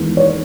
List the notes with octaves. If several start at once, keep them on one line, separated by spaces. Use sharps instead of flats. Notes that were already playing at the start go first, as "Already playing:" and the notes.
Already playing: E2 D#3 G#3 B3
C#5